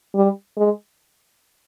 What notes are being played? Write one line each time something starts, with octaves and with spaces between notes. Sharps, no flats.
G3
G#3